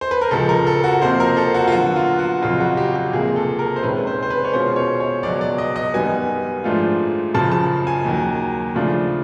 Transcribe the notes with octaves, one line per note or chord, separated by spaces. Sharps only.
C5
B4
A#4
C#2 C#3 F3 A4
A#4
A4
F#4
F2 C3 F3 A#3 C5
A#4
A4
F#4
F4
D3 F#3 B3 F#4
F4
F#4
F2 C#3 F#3 F4
F#4
G4
G4
C#2 C3 F3 A#3 G#4
A4
A#4
C5
C#2 C3 D#3 G#3 C#4 B4
C5
C5
B4
C#5
B2 G#3 C#4 F4 C5
C#5
C#5
C#2 B2 F#3 D5
D5
D#5
D#5
F#2 D#3 G3 B3 G#5
G#2 F3 A3 D4 F4
F#2 C#3 F3 A5
A5
G#5
D#2 D#3 F#3
C#3 F3 A3 D4 F4